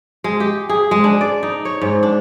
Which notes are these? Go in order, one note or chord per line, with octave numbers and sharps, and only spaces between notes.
G#3
G4
G#4
G#3
D4
D5
D#4
C#5
G#2
D4